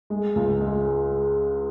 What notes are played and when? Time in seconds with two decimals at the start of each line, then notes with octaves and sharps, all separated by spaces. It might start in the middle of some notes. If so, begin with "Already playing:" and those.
0.10 G#3
0.36 C#2
0.60 G#3